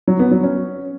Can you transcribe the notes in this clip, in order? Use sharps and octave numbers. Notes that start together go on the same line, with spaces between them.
F#3
B3
F#3
C#4